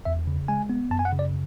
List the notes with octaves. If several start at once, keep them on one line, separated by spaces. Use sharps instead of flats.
E2 E5
C#3
G#3 G#5
B3
F#2 A5
G#5
F#5
C#3
D5